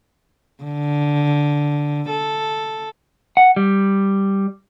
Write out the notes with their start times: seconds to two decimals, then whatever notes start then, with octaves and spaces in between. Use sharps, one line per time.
0.63 D3
2.09 A4
3.37 F#5
3.56 G3